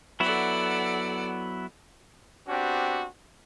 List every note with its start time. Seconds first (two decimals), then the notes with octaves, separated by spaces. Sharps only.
0.20 F#3 B3 E4 A4 D5 F#5
2.47 B3 C4 D4 F#4 G4